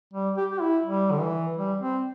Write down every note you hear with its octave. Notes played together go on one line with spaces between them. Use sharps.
G3
G4
G4
E4
G3
D3
E3
G3
C4